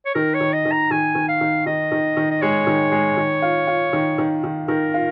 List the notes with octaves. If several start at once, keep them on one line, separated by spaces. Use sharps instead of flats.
C#5
D#3 A#4
C#5
D#3
D#5
D#3
A#5
D#3 G#5
D#3
F5
D#3
D#3 D#5
D#3
D#3
D#5
G#3 C#5
D#3
G#3
D#3
F4
F4
D#3
D#3
D#3
D#3 A#4
F4